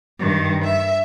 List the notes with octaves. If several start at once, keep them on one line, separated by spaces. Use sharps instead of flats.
G2 D#3
E5